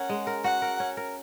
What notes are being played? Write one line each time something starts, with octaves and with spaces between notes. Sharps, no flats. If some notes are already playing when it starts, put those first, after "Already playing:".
Already playing: C#4 A#4 F#5
G#3
A#4
F#4 F#5
A#4
C#4
A#4